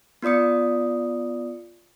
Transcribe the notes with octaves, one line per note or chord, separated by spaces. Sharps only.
B3 F4 D5 D#6 C#7